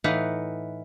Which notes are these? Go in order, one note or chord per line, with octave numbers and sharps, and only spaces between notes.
A2 E3 D#4 B4 F5 F#5